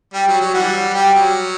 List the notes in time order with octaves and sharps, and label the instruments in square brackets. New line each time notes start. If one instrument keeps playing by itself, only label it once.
[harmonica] G3 [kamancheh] G5
[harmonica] F#3
F#3
[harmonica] E3 G3 [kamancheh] F#5
[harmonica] G3 [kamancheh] G5
[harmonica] F#3